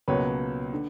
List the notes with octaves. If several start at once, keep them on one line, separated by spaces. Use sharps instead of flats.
C#2 B2 F#3 A#3 B4 C#5
D3